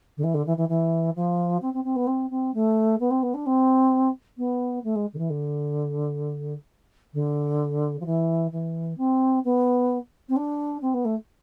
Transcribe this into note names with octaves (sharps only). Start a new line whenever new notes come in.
D3
E3
D3
E3
E3
E3
F3
C4
C4
C4
B3
C4
C4
A3
B3
C4
B3
D4
C4
B3
A3
G#3
D3
E3
D3
D3
F3
E3
E3
C4
B3
C4
D4
C4
B3
A3